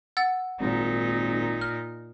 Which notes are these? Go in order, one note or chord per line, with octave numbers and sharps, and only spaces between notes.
F#5 E6 A6
G#1 A#2 D#4
F6